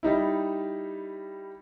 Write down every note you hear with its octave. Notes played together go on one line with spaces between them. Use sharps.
G3 D#4 E4